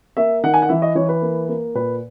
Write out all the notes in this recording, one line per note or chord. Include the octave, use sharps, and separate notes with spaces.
A#3 E5
D#3 F#5
G#5
F#5
E3 E5
D#5
E3 C#5
B4
A#3
A#3
A#2 B4